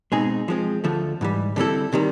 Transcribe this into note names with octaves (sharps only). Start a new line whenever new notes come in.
B2 G#3 C4 D#4 G#4
F3 G#3 C4
D2 D3 F3 A3
G#2 E3 G3
D3 G3 C4 E4 A4
C3 D#3 G3